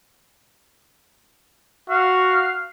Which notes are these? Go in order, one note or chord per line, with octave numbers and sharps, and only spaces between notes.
F#4 F5